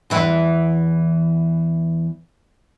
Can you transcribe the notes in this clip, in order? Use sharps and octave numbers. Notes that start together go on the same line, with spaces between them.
E2 E3 E4